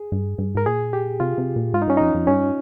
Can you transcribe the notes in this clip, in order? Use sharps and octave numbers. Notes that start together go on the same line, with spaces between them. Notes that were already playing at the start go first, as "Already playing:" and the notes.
Already playing: G#4
G2
G2
G#2 A#4
A#2 G#4
G4
C3 F4
C3
A#2
G#2 F4
D#4
G2 C#4
F2 D#4
F2
G2 C#4